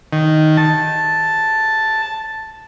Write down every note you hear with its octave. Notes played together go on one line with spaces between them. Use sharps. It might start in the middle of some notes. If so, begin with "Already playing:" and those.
D#3
A5